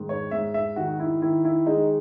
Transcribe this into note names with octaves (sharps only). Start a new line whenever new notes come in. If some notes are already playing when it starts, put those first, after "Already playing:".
Already playing: G#2 D#3
C#5
G#2 E5
E5
D#3 F#4
E4
D#3 E4
E4
G#3 D#4